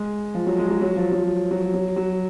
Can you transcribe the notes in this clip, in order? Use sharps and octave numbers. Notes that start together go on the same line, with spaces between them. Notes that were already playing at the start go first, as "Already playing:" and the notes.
Already playing: G#3
F3
F#3
G#3
F#3
F#3
F3
F#3
F#3
F#3
F#3